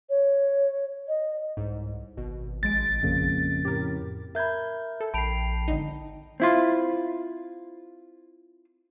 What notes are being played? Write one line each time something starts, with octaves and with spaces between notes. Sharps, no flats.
C#5
D#5
C2 G#2
G#1 B2
A#1 G#3 A6 D7
F2 C#3 A#3
A2 G4 A#4
A#4 E5 B5 G6 G#6
A4
A#1 G5 A5 B5 C7 D7 F7
G#1 D3 D#4
C4 E4 F4